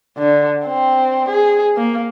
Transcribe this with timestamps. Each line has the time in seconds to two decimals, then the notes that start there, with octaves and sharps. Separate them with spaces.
0.18 D3
0.65 C4
1.29 G#4
1.76 A#3